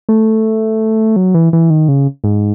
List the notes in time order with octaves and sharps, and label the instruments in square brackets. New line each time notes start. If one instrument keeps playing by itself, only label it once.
[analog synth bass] A3
F#3
E3
E3
D#3
C#3
G#2